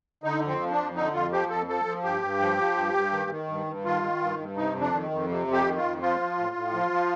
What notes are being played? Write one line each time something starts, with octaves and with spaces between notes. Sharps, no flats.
D3 D#4
F2
C4
F3
D4
F2
D3 D#4
F2 F4
F3 G4
F2 A4
F3 A4
F3
G2 G4
G2
F3
F3
G2
G2
D#3
D#3
G2
G2
D#3 F4
D#3
G2
G2
C3 D#4
F2
D4
D#3
F2
C3
F2
G4
D#3
F4
F2
F3 F4
F3
A2
A2
F3
F3